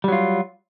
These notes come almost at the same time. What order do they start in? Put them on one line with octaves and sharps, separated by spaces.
G3 F#3 F4